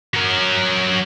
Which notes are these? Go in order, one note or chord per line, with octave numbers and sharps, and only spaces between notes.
F#3 A#4